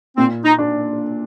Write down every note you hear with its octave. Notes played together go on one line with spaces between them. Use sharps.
A#2 C4
D#4
D4